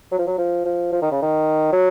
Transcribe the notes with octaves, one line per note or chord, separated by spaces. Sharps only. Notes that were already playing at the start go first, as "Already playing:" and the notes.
F#3
F3
F#3
F3
F3
F3
D#3
C#3
D#3
F#3